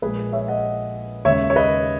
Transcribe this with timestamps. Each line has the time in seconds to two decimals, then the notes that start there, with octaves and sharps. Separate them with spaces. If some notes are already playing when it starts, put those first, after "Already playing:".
0.02 A#1 A#2 G#3 G#4 B4
0.32 C#5 E5
0.48 D#5 F#5
1.25 D#2 C#3 G#3 C#5 E5
1.50 C#5
1.56 B4 D#5